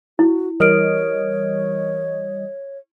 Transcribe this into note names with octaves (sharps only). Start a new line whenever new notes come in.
E4 F#4
E3 G3 A#4 C#5 D#5 F6 D7